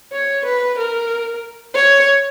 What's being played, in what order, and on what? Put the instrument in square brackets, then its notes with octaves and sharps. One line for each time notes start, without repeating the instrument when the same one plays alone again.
[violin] C#5
B4
A#4
C#5